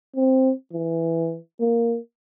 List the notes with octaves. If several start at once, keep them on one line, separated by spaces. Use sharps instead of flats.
C4
E3
A#3